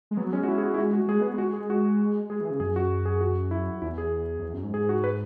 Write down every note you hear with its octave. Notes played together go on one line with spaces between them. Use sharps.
G#3
F#3 B3
G#3 C#4
F#4
E4
G#4
F#4
E4
F#4
F#4
G#3 G#4
B3 G#4
G#3 F#4
G#4
F#4
G#3 G#4
E3
G#4
C#3
F#2 G#4
F#4
G#4
F#4
E4
E2 E4
G#4
F#2
E2
F#2
G#2
G#4
F#4
B4